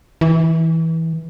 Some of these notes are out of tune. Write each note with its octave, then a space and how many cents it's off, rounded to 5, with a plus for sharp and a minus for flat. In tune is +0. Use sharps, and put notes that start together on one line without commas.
E3 -20